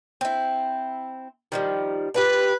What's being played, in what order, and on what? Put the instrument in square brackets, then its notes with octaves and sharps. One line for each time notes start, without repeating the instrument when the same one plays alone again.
[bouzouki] C4 E4
D#3 F3 G3
[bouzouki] D4 F4 G4 [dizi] B4